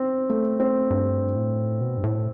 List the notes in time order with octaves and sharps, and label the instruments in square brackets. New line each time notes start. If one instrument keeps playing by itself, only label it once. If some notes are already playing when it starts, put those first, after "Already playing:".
Already playing: [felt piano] C4
A3
C4
[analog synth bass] G2
A2
B2
G2
A2